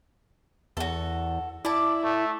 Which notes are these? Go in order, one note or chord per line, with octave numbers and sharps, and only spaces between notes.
E2 F#4 A4
E4 D5 A5
A3